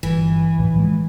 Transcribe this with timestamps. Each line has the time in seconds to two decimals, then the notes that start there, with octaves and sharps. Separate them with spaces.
0.03 G1 E3
0.58 B1 A2
0.76 F3 G#3